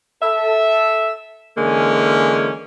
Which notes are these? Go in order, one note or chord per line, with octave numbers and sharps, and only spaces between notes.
A4 E5
D3 E3 G#3 A#3 C#4